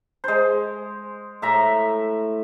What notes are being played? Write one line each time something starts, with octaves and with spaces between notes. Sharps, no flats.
G#3 C5
A2 E5 A#5